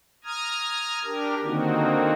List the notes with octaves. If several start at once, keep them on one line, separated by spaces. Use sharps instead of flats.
A#5 D#6 F6 G#6
D4 G4 A#4
D3 D#3 A#3 C4 D#4 F#4